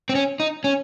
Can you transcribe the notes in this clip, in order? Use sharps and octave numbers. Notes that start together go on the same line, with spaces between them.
C4
C#4
D#4
C#4